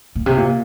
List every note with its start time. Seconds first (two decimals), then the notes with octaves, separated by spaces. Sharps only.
0.16 A#2
0.26 C3
0.37 A#2